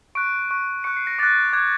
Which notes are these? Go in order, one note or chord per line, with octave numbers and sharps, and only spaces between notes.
C#6 F#6 D7
C#6 F#6
C#6 F#6 C#7
C7
A#6
D6 F#6 A6
D6 F#6 G#6